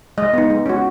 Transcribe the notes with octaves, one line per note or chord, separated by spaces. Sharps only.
G#3 D#5
B3 D#4
G#3
C#4 F#4